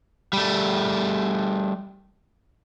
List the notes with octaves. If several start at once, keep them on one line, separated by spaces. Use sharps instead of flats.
G3 A3